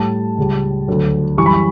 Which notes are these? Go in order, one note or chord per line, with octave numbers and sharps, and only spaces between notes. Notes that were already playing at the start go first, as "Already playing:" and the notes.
Already playing: A2 G3 A5
C#2 C#3 G3
D2 D3 F#3
F#2 E3 G3 C#6
B5
C#6